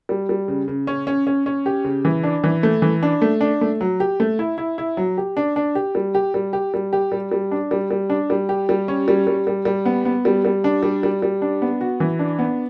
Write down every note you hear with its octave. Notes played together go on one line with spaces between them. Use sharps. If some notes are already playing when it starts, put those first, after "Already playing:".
G3
G3
C#3
C#3
C#4
C#4
C#4
C#4
G4
C#3
E3
D4
E3
A3
E3
D4
A3
D4
A3
F#3
G4
A3
E4
E4
E4
F#3
G4
D4
D4
G4
G3
G4
G3
G4
G3
G4
G3
G3
D4
G3
G3
D4
G3
G4
G3
C#4
G3
G3
G3
G3
B3
B3
G3
G3
D4
G3
G3
G3
D4
B3
F#4
E3
D4
B3